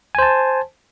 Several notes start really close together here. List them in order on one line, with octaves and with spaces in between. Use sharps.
G#5 C5 A5